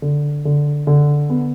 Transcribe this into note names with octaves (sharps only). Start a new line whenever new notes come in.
D3
D3
D3
B3